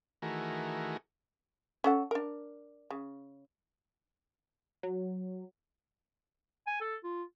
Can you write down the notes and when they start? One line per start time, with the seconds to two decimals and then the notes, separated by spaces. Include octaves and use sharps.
0.22 D#3 E3 A3 F#4 G#4 A#4
1.84 C#4 A4 F#5
2.11 D4 A#4
2.90 C#3
4.83 F#3
6.67 G#5
6.81 A4
7.03 F4